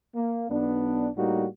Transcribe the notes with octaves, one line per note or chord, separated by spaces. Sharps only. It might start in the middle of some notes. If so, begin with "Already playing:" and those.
A#3
B1 B3 D4
A2 G3 A#3 D#4 F#4